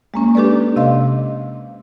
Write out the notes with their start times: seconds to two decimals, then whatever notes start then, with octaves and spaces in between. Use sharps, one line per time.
0.14 G#3 A#3 C#4
0.35 D4 G4 A4 B4 D5
0.76 C3 D#5 F5 C6